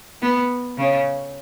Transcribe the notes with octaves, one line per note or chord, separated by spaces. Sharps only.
B3
C#3